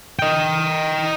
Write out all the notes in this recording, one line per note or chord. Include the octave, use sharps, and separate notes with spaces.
D#5 G5